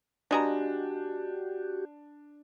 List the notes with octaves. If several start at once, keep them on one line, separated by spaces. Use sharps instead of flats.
B2 G#3 D4 F#4 G4 A#5